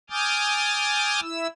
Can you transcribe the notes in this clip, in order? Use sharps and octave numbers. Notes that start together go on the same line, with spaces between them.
G#5 D6 D#6 F6 G6 A6
E4 E6